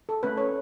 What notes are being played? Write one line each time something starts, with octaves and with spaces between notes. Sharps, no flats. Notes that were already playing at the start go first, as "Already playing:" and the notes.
A4
A3 C#4 B4
C#5